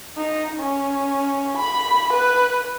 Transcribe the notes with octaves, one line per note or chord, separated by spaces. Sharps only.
D#4
C#4
B5
B4